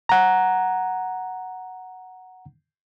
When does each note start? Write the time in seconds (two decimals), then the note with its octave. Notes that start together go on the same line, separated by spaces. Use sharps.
0.09 F#5 A#5